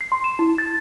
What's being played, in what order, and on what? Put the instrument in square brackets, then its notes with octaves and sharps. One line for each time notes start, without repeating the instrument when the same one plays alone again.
[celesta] C7
C6
E7
E4
A6